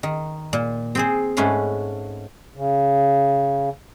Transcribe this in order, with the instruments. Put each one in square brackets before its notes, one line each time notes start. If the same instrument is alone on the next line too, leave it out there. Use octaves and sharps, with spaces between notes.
[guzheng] D#3
A#2
C4 G#4 C5
G#2 A3 C#4 B4 C6
[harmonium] C#3